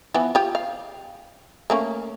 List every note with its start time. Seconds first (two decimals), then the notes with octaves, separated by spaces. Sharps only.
0.14 E3 F3 B3
0.35 F4 G4
0.55 F5
1.70 A3 A#3 C#4